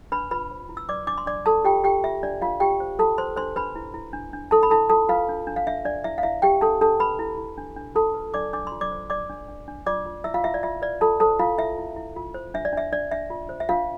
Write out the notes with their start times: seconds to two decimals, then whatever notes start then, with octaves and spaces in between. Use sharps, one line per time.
0.12 D4 B4 B5
0.31 F4 B4 B5
0.51 C5
0.69 E4
0.77 E6
0.89 B4 D5 D6
1.07 D4 D6
1.18 C6
1.26 D4 D5 D6
1.46 F4 A4 A5
1.65 F4 G4 G5
1.84 F4 G4 G5
2.04 F4 E5
2.23 D4 D5
2.41 D4 F4 F5
2.60 F4 G4 G5
2.80 C5
2.99 F4 A4 A5
3.18 B4 C5 C6
3.36 D4 C5 C6
3.56 D4 B4 B5
3.75 E4
3.94 E4
4.13 D4
4.33 D4
4.51 E4 A4 A5
4.63 B5
4.70 E4 A4 A5
4.90 F4 A4 A5
5.09 F4 B4 F5
5.29 D4
5.47 D4
5.56 F5
5.67 D4 E5
5.85 D4 D5
6.04 E4 E5
6.18 F5
6.23 E4 E5
6.42 D4 G4 G5
6.61 D4 A4 A5
6.81 D4 A4 A5
7.00 D4 B4 B5
7.19 E4
7.38 E4
7.58 D4
7.76 D4
7.95 F4 A4 A5
8.14 B4
8.34 D4 D5 D6
8.53 D4 D6
8.67 F4 C6
8.81 D5 D6
8.91 C5
9.10 D4 D5 D6
9.29 D4
9.48 D4
9.68 D4
9.86 F4 D5 D6
10.06 F4
10.24 E4 E5 E6
10.34 F4 F5
10.44 E4 E5
10.54 D5
10.63 F4 E5
10.82 B4 D5
11.01 F4 A4 A5
11.20 A4 C5 A5
11.39 E4 F4 F5
11.58 E4 E5
11.78 E4
11.96 E4
12.16 F4
12.34 C5
12.54 D4 E5
12.65 D5
12.73 D4 E5
12.93 D4 D5
13.12 D4 E5
13.30 F4
13.49 C5
13.60 E5
13.69 D4 F4 F5